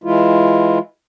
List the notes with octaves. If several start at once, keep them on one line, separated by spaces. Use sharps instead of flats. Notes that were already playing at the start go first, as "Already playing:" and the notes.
E3 G#3 E4 F4